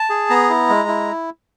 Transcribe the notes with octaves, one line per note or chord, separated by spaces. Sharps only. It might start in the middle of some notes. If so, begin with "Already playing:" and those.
Already playing: A5
G#4
B3 A#5
E4
G#3
E4